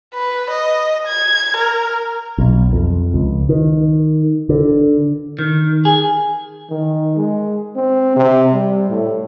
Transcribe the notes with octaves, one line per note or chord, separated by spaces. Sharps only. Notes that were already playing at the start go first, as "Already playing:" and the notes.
B4
D#5
G#6
A#4
B1
F2
C#2
D#3
D3
D#3
G#4
D#3
G#3
C4
C3
G3
A2